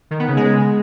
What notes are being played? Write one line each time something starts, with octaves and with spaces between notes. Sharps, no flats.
D#3
B3
C#3
G#3